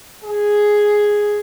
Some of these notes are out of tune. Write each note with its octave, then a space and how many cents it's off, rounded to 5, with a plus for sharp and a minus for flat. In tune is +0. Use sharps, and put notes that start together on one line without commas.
G#4 +0